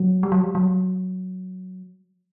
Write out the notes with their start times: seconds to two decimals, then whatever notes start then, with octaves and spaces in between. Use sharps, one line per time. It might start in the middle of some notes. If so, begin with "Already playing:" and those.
Already playing: F#3
0.23 G3
0.32 F#3
0.40 G3
0.55 F#3